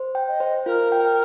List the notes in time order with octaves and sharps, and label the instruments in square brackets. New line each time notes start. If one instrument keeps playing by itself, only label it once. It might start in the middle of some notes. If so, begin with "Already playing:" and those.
Already playing: [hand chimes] C5
G5
[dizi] D#5
[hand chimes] C5
[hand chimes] F4 [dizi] A#4
[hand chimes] G5